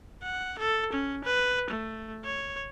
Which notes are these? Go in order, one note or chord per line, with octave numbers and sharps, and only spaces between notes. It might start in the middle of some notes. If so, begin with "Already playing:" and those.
F#5
A4
C#4
B4
A3
C#5